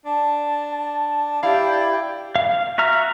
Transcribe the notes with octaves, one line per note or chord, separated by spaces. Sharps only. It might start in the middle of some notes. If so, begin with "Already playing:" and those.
D4 A5
E4 G4 D5 F5 G5
F5
F#4 E5 A#5 F6